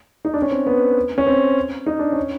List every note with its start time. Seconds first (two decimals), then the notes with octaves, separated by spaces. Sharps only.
0.25 D#4
0.34 D4
0.42 C#4
0.51 C4
0.66 B3
1.18 C#4
1.26 C4
1.86 D#4
1.99 D4
2.12 C#4